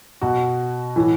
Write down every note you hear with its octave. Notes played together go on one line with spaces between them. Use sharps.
B2 F#4
A2 E3